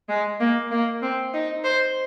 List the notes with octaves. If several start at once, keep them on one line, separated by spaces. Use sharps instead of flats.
G#3
A#3
A#3
C4
D#4
C5